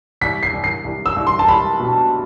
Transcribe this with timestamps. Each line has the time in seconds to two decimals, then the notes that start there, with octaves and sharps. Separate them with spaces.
0.21 C2 B6
0.43 C7
0.53 C2
0.64 C7
0.84 C2
1.06 E6
1.16 C2
1.27 C6
1.39 A5
1.48 C2 B5
1.80 B2